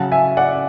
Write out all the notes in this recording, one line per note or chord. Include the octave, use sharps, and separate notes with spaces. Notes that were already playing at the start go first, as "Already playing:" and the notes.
Already playing: C#3 F#3 C#4 F#5 A5
E5 G#5
D5 F#5